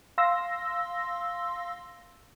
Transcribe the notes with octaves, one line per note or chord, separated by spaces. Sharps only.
F5 C6 E6 A#6